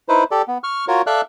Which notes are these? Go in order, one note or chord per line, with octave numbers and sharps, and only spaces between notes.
D#4 E4 B4 C5
G4 A4 D5
B3
C#6 F6
F4 F#4 A#4 C#5
A4 D5 E5 F5 E6 F#6